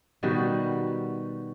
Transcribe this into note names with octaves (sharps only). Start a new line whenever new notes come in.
B2 D#3 G3 F#4